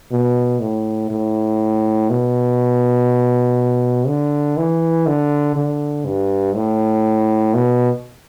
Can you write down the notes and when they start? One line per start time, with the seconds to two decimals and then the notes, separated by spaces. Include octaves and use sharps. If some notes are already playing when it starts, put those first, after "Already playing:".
0.11 B2
0.61 A2
1.11 A2
2.10 B2
4.08 D3
4.57 E3
5.07 D3
5.56 D3
6.06 G2
6.56 A2
7.54 B2